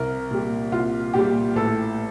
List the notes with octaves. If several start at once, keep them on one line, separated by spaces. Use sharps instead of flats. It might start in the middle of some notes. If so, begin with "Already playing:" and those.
Already playing: C2 A#4
A#2 G3
C2 F4
A#2 G3 G4
A1 A4